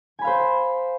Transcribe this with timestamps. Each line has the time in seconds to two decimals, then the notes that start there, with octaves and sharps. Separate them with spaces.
0.19 G#5
0.21 B5
0.24 F5
0.27 C5